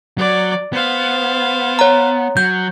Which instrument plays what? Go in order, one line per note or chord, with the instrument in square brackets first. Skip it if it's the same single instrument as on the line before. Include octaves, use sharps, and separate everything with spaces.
[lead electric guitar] F#3 [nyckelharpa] D5
[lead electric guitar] B3 [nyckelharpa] C5 F5
[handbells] C#5 A#5
[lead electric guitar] F#3 [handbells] G6